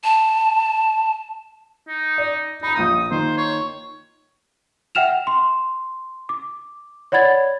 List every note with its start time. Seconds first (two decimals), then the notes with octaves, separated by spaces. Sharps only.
0.04 A5
1.88 D#4
2.18 D5
2.63 D#4 A#5 B5
2.75 A#1 F4 D#6 G6
3.11 D#3 A#3 F4 C5
3.37 C#5
4.95 E5 F#5 G5 F6 E7 F7
5.27 C6
6.29 D6
7.12 C#5 D5 F#5 B5 G#6 A6